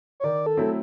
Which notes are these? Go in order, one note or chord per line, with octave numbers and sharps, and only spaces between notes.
C#5
D#3 D5
A4
F#3 A3 C4 E4